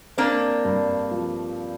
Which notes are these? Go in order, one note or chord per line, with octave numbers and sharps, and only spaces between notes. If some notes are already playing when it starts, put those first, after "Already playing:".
A#3 C4 D4
G2
F3